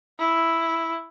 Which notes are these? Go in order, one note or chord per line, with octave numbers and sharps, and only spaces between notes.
E4